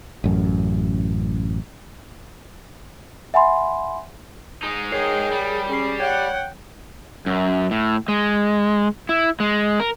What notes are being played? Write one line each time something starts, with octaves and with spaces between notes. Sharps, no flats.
A1 F#2
E5 F#5 G#5 B5 C6
G#3 D#4
G#4 A#4 C#5 G5 C7
G3
C#4 G#4 C7
C#5 F#5 G5
F#2
A2
G#3
E4
G#3
A#4